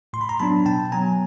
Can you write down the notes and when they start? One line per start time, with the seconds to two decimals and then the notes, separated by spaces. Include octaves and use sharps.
0.13 A2 C6
0.21 B5
0.29 A#5 C6
0.40 F#3 B3 D4 A5 B5
0.66 B2 G5 A5
0.92 F#3 B3 G#5 A#5